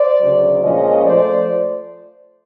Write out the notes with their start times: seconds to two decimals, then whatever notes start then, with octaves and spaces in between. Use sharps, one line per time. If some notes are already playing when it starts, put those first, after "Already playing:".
Already playing: C5 D5
0.20 D2 C#3 F#3
0.62 A#2 F3 G#3 C#4 C#5 D#5
1.05 F3 A3 C5 D5